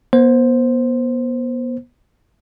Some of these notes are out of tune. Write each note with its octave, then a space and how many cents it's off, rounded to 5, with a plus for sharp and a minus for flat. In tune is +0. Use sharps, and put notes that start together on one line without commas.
B3 -35 C5 +0